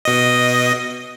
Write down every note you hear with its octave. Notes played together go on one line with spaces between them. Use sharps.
B2 D#5